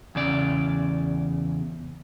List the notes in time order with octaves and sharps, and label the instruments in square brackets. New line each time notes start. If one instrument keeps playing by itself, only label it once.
[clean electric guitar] E2 C#3 D5